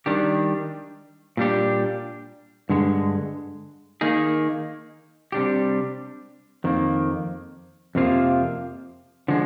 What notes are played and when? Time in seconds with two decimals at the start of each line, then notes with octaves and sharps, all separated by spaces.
0.06 D#3 G3 D4 G4
1.37 A#2 G3 D4 G4
2.69 G2 D3 G#3
4.01 D#3 A#3 D#4 G#4
5.32 C3 G3 D4 G4
6.64 F2 D#3 A#3
7.95 F2 C3 F3 A#3 F4
9.28 D3 F3 G#3